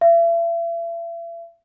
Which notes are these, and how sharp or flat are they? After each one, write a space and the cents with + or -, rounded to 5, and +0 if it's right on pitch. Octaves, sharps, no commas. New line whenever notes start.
E5 +40